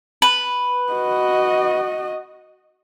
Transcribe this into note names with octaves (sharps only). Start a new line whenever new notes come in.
B4
F#4 D#5